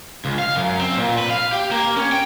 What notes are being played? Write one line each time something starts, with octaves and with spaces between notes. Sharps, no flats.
C#2
F5
F#2
C4
A#2
B4
F5
G4
A#3
C#4
G5